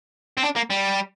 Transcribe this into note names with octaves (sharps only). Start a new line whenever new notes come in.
C4
D4
A#3
G3